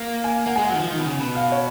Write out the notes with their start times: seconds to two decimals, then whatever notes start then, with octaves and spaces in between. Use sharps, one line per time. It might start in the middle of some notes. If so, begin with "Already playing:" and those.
Already playing: A#3
0.24 G#5
0.46 A#3 F#5
0.56 G#3 G#5
0.65 F#3 F#5
0.75 D#3
0.80 F3
0.91 D#3
0.99 B2
1.06 C#3
1.20 B2
1.35 F5
1.52 C#5